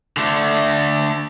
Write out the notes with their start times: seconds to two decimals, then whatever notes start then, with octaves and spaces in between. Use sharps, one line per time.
0.17 D3 A3